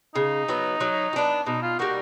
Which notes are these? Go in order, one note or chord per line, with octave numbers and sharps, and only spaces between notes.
C#3 D#4
F#3 B3
F#3
F#4
B3 D4
B2 D#4
F4
G3 A#3 D#4 F#4